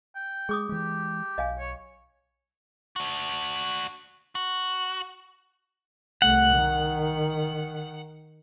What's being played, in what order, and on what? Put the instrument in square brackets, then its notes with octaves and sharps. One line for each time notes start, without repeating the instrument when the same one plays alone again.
[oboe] G5
[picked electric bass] G#3 [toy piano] G#4 D6 D#6
[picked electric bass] E3 G#3 [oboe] G4
[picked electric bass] B1 [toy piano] D#5 F5 G#5
[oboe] C#5
[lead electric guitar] D4 F#4
F#4
[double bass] C2 A3 [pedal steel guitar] F#5
[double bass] D#3